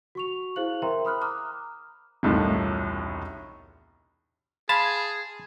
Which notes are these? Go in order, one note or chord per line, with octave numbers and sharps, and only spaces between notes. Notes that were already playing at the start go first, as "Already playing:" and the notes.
F#4 C#6 F7
E4 G#4 C5 F5 F#6 F#7
A#4 C5 E5 G5 A#5 C6
B5 D#6 F6 F#6
A#5 D6 D#6 F6 F#6
E1 C2 A2 D#3 F4
G#4 F5 A5 B5 C6